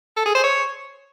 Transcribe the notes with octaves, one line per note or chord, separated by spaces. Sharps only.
A4
G#4
C5
C#5